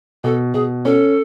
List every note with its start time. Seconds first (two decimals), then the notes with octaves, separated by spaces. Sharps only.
0.24 B2 A4
0.54 B2 G#4
0.85 C#4 A4